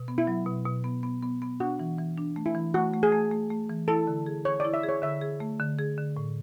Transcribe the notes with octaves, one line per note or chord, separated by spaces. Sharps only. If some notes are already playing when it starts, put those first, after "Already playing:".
Already playing: B2
B3
E4
F#3
B2
B2
B3
B3
B3
B3
D4 F#4
E3
E3
D4
A3
E4
E3
A3 F#4
A3
G#4
A3
A3
A3
E3
E4 A4
D3
G#4
G#4 C#5
E4 D5
E5
G#4
C#5
D3 E5
G#4
A3
D3
G#4
D3
A2